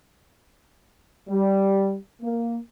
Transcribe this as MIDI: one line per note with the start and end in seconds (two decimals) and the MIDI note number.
1.30 1.96 55
2.22 2.58 58